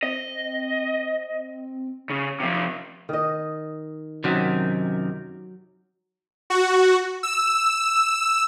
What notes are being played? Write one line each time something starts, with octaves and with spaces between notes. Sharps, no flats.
C4 D#5
C#3 C#4
C3 F3
D#3 D#5
F#2 C3 D#3 F#3 F#5
F#4
E6